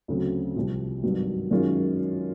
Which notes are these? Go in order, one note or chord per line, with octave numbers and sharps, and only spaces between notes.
D2 C#3 F#3 A3 C4
C2 C3 F3
G#1 G2 D#3 F#3
F#2 D#3 G#3 C#4 F4